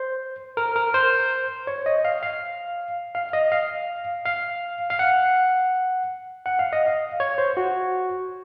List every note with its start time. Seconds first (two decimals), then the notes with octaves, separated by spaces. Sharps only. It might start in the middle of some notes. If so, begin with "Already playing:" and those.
Already playing: C5
0.57 A#4
0.76 A#4
0.94 C5
1.67 C#5
1.86 D#5
2.05 F5
2.23 F5
3.15 F5
3.33 D#5
3.52 F5
4.26 F5
4.90 F5
4.99 F#5
6.46 F#5
6.59 F5
6.73 D#5
6.86 F5
7.20 C#5
7.38 C5
7.57 F#4